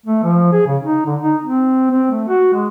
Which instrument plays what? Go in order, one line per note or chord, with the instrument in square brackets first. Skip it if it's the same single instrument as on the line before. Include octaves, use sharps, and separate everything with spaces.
[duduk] A3
F3
G#4
C#3
D#4
D3
D#4
C4
C4
A3
F#4
G#3